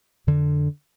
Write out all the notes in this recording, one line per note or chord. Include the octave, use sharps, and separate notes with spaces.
F2 D3